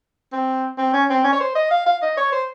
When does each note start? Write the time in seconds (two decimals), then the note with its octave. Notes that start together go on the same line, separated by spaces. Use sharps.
0.32 C4
0.78 C4
0.93 C#4
1.10 C4
1.24 C#4
1.33 C#5
1.40 C5
1.55 D#5
1.71 F5
1.86 F5
2.02 D#5
2.17 C#5
2.32 C5